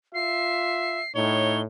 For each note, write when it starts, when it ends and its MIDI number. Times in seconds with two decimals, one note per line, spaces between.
0.14 0.99 65
0.14 1.05 76
0.14 1.14 96
1.15 1.64 45
1.15 1.61 63
1.15 1.61 73
1.15 1.61 103